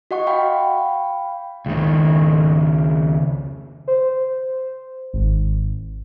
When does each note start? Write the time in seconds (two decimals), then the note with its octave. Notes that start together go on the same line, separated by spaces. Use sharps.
0.11 F#4 D#5 F#5 C#6
0.27 F5 G5 B5
1.66 C#2 D#3
3.88 C5
5.13 G#1